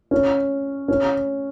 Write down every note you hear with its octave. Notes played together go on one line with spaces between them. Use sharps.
C#4
C#4